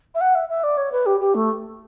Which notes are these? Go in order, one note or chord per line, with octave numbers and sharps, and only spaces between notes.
E5
F#5
E5
E5
D5
C#5
B4
G4
G4
A3